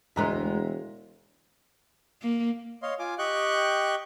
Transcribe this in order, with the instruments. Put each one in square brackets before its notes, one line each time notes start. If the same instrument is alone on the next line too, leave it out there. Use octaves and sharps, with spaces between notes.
[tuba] E1 [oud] D2 G#3 B3 [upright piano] E5 A#5 C6
[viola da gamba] A#3
[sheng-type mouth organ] C#5 D#5 F5 C6
F4 G#5 D6
G4 D#5 G5 C#6 F#6 G6